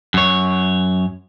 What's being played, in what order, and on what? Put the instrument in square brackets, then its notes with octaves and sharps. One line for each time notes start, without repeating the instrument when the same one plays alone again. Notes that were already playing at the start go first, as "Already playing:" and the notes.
[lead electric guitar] F#2 C#5